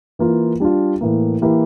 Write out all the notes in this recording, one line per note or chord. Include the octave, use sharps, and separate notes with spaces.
E3 A#3 F4
G3 D4 F4
A2 E3 A#3
E3 A#3 E4 G4